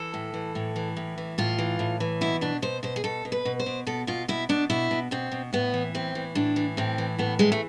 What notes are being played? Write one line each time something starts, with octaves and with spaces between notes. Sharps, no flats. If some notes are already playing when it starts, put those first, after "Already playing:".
Already playing: E3 A4
A2
E3
A2
E3
A2
E3
A2 F4
E3
A2
E3
B2 E4
B2 D4
B2 C5
B2 C5
G#4
B2 A4
B2
B4
B2
C5
B2
B2 A4
B2 F4
B2 E4
B2 D4
B2 E4
B2
B2 C4
B2
A2 B3
E3
A2 C4
E3
A2 D4
E3
A2 C4
E3
A2 B3
E3 G#3
A3